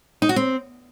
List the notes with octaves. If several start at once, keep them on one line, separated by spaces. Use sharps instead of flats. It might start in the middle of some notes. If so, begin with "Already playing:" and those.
D#4
F#4
C4